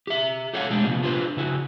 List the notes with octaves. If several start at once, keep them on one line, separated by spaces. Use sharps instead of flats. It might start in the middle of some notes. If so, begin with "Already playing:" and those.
G4 E5
G4 A4 C#5 F5 F#5
B2 G#3 A3 D4 G4
C3 F3 A#3 B3
D4 F4 G4 B4 C5
C#3 E4 F#4